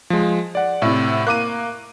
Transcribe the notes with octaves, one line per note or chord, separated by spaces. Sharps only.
F3 G#3
D5 F#5
A2 C3
A#3 D6 F#6 D#7